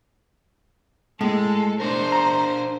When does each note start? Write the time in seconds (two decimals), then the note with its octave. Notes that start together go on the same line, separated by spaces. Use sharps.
1.21 A2 G#3 A4
1.80 D4 A#4 C5
2.12 A#5